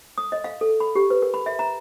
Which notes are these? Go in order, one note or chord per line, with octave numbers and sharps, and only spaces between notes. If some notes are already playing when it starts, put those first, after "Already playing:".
D#6
D#5
F5
A4
B5
G4
B4
A#4
B5
E5
A#5